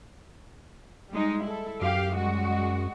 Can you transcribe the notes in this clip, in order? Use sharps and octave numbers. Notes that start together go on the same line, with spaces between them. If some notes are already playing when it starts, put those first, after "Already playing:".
G3 G#3 D#4
E4 A4
F#2 G4 F5
G3 G#3 F#4